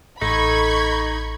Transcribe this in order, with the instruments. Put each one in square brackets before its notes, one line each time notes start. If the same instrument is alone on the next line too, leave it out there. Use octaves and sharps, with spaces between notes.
[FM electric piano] A1 [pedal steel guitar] D#4 [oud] A4 [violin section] B5 C#6 G#6